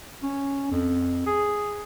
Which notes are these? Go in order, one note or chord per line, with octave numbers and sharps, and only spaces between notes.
C#4
F2
G#4